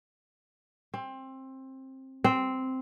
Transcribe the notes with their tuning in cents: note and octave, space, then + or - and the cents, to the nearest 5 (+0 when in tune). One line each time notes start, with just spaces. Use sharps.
C4 +20
C4 -5